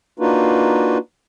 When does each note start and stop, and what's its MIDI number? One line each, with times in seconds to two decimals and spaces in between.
0.19 0.98 58
0.19 0.98 62
0.19 0.98 63
0.19 0.98 65
0.19 0.98 66
0.19 0.98 71